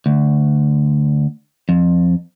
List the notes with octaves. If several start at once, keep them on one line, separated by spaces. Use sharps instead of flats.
D2
F2